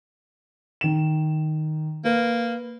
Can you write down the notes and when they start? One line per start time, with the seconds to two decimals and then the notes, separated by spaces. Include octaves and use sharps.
0.81 D#3 E7
2.05 A#3 B4